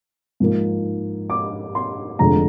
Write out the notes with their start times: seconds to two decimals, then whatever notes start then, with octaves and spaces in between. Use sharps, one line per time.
0.40 G#2 F3 A#3
1.30 D6
1.75 C6
2.19 F1 F2 D3 G#3 D4 A#5